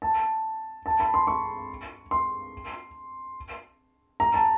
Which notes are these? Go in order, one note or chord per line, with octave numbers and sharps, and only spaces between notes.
A5
A5
B5
C6
C#6
C6
A#5
A5